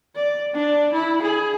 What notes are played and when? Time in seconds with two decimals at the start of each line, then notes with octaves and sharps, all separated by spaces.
0.16 D5
0.54 D4
0.93 E4
1.22 G#4